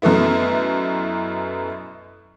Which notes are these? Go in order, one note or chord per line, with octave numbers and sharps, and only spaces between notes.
F#2 B2 A3 B3 E4